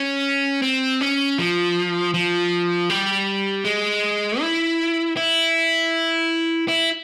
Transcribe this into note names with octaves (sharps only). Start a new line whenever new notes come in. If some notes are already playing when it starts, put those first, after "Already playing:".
Already playing: C#4
C4
C#4
F3
F3
G3
G#3
E4
E4
E4